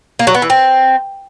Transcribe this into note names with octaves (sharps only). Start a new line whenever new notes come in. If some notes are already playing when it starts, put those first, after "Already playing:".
A#3
F#3
B3
E3
C4